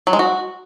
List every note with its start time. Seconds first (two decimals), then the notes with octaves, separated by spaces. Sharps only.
0.07 F#3
0.13 G#3
0.19 F#4